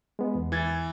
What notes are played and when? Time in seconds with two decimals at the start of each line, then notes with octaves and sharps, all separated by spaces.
0.19 G#3 B3
0.35 E2
0.52 E3 G#6 A6